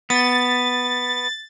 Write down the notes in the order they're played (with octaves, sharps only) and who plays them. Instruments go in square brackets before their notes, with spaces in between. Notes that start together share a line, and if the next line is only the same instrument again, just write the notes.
[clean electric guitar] B3 [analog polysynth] A6